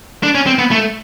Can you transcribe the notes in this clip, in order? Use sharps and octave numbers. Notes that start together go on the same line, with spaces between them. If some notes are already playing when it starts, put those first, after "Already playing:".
D4
C#4
C4
B3
A3